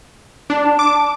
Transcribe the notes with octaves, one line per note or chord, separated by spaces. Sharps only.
D4 A5
D6